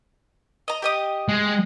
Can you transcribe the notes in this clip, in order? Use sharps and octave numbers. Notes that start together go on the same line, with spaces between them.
D#5 A#5
G4 D#5 D#6
G#3